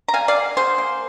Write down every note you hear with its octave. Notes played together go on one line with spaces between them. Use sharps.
A#5
G3 F5 G#5
D5 F5
D3
D3 G#4 C5
A#3